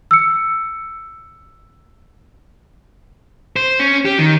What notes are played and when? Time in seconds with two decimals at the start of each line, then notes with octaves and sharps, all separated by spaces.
0.11 E6 C#7
3.56 C5
3.79 C#4
4.05 G4
4.19 D#3